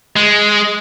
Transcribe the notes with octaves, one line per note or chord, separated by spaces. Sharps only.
G#3